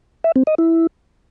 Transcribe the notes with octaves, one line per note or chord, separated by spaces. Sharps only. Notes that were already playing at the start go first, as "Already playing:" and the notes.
E5
C4
D#5
E4